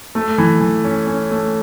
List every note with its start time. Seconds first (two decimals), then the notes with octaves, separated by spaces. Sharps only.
0.15 A3
0.38 E3
0.60 E3
0.84 C#4
1.07 C#4
1.31 A3